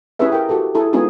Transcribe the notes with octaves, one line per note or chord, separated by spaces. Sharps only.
C#4 E4 G4 G#4 B4 E5
A#4 G5
F#4 G4 A4 B4
E4 G#4 A4 E5
G#3 B3 C#4 D#4 F4 G#4